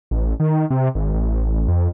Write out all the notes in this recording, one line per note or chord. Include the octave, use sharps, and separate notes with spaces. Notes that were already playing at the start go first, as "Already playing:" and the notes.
A1
D#3
C3
G#1
A1
F2